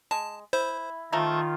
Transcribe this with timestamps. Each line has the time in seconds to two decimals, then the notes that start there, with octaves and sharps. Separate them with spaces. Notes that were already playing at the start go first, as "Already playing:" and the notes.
0.11 G#3 A5
0.53 E4 C5
1.12 D#3 F3 A3 F4 A#5